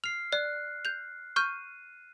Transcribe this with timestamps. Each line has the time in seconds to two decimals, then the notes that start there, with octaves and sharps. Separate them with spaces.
0.04 F6 C7 F7
0.33 D5 F#6
0.85 G6 F7
1.36 C#6 F6 G6 D#7